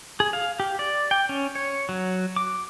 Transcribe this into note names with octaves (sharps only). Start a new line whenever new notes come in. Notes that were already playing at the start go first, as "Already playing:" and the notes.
G#4
F5
G4
D5
G5
C#4
C#5
F#3
D6